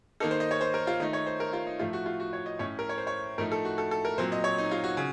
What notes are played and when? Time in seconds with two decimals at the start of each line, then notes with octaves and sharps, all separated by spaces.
0.20 D#3 A#3 D#4 A4
0.31 C5
0.40 D#5
0.51 C#5
0.61 C5
0.74 A#4
0.87 F4
1.00 D#3 A3 D#4 D#5
1.13 C#5
1.27 C5
1.40 A#4
1.53 F4
1.67 D#4
1.79 A2 F3 A3 F4
1.93 F#4
2.06 F4
2.20 F#4
2.33 C#5
2.46 D#5
2.59 A2 A3 C#4 C#5
2.79 A#4
2.89 C#5
2.98 C5
3.07 C#5
3.38 A2 F3 A3 D#4 A#4
3.52 A4
3.65 F#4
3.78 A4
3.91 A4
4.05 A#4
4.18 A#2 F#3 C4 C5
4.32 D#5
4.44 C#5
4.58 D#4
4.71 F4
4.84 F#4
4.97 C#3